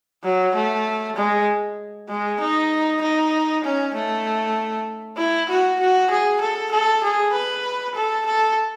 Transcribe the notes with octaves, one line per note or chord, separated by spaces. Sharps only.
F#3
A3
G#3
G#3
D#4
D#4
C#4
A3
E4
F#4
F#4
G#4
A4
A4
G#4
B4
A4
A4